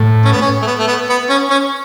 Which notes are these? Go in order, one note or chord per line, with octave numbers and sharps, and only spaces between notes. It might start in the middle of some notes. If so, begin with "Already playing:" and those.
Already playing: A2
C#4
B3
C#4
A3
B3
A3
B3
B3
C#4
C#4